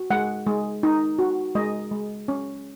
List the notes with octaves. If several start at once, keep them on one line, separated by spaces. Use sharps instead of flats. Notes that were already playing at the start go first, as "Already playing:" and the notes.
Already playing: F#4
G#3 F#5
G#3
D#4
F#4
G#3 D#5
G#3
C#4